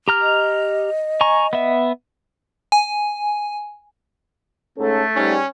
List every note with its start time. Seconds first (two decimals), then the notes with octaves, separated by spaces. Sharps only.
0.08 G4 A#5 F6
0.21 D#5
1.21 G#5 A#5 C#6
1.53 B3 E5
2.72 G#5
4.78 G#2 A3 C#4 A4
5.16 G#2 G3 C#4